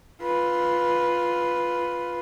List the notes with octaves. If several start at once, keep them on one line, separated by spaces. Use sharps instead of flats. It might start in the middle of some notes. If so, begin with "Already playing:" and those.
F4 B4